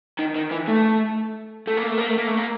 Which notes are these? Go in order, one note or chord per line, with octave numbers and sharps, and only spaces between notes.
D#3
D#3
E3
A3
A3
A#3
A3
A#3
A3
A#3
A3
A#3